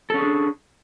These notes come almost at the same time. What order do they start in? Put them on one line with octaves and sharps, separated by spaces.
A4 C#4 G#4 D4